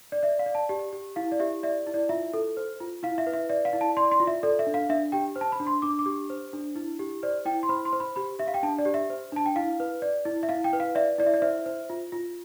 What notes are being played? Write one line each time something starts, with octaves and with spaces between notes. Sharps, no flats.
D5
D5 E5
F5
D5
A5
G4
G4
E4 F5
D5
G4 E5
D5 E5
E4
D5
F4 E5
A4
C5
F4
E4 F5
E5
B4
E5
D5 E5
F5
E4
A5
D5 C6
C6
F4
E5
A4 D5
E5
D4
F5
D4 E5
G4 G5
C5
A5
B5
D4
C6
D4 D6
D6
G4
C5
D4
E4
G4
C5 D5
E4 G5
C6
C5 B5
C6
C5
B5
G4 B5
G4 E5
F5
G5
D4 A5
D5
G4
E5
C5
D4 A5
G5
E4 F5
B4
D5
E4
E5
E4 F5
G5
B4
F5
D5 E5
E4 D5
E5
D5
C5 E5
C5
F4
F4